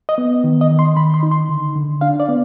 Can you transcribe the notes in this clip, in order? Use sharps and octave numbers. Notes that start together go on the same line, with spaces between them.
D#5
B3
D#3
D#5
D#3
C6
D#3 B5
C6
D#4
C6
D3
D3
D4 F5
D5
B3